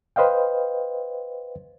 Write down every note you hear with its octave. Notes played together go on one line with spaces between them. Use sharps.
B4 C5 D#5 F5 G5